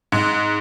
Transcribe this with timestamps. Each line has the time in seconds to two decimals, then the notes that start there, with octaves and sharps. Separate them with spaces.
0.12 G#2